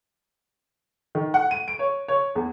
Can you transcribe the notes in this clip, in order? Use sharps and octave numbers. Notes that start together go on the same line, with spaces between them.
D#3
F#5
D#7
D7
C#5
C#5
E2